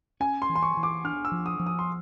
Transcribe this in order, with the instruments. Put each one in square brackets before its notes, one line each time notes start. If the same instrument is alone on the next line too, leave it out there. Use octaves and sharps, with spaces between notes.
[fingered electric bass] C#4 [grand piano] G#5
[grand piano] C6
[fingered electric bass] E3
[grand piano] C6
C#6
[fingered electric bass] E3
[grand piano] D6
[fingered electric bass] D4 [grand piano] F6
[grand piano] E6
[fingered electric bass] F3
[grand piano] D#6
[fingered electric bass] F3
[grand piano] D#6
C6